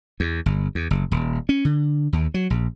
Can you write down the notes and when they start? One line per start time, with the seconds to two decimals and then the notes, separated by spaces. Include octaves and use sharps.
0.20 E2
0.46 G1
0.75 E2
0.91 F#1
1.12 D#1
1.49 C#4
1.65 D3
2.13 D#2
2.34 F#3
2.50 A#1